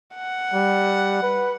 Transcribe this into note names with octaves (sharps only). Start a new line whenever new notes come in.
F#5
G3
B4